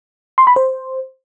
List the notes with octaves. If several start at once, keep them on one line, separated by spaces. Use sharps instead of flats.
C6
B5
C5